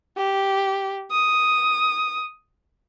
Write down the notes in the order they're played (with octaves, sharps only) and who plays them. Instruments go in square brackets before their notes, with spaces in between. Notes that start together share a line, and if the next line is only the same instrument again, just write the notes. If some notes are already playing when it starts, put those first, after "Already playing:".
[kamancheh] G4
D#6